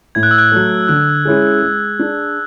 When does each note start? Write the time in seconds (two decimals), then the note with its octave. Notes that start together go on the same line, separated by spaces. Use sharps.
0.15 A2 G#6
0.23 F#6
0.31 E6
0.38 F#6
0.52 F#3 A3
0.88 D3 F#6
1.25 G#3 C#4 E4 G#4
1.62 G#3
1.99 D4 G#4